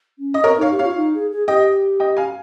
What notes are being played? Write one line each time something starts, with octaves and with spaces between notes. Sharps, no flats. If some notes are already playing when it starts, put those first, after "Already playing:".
C#4
D#5
C4 A#4 C#5
D#4
C#5 F5
G4
F4 C#5 F5
D#4
G#4
G#4
G4 D#5 G5
D#5 G5
F5 G#5